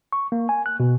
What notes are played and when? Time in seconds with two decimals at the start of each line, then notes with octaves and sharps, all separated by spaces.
0.12 C#6
0.32 A#3
0.49 G#5
0.66 F#6
0.80 B2